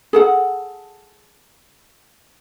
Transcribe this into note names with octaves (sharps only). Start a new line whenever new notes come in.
G#4 A4 F#5